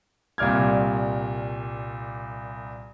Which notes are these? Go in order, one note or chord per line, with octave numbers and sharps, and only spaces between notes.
C2 A#2 D5 F6 G#6